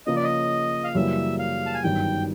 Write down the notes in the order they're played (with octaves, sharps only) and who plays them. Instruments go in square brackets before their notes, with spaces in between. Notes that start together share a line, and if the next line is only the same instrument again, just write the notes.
[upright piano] C#3 F3 A#3 C#4 [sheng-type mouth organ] D#5
[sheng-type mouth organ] D5
D#5
F5
[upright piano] F#2 C#3 E3 G3 A#3 [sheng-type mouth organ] E5
[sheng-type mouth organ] F5
A5
G#5
[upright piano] G1 F#2 D#3 G3 [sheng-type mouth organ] G5